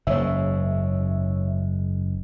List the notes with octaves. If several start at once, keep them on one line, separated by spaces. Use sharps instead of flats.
F#1 G#2 C#5 E5